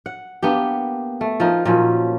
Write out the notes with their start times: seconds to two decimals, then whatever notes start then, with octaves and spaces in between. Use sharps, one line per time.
0.06 F#5
0.42 A#3 B3 D4 G4
1.21 A3
1.40 F3 D#4 A#4
1.65 A#2 F3 F#3 C#4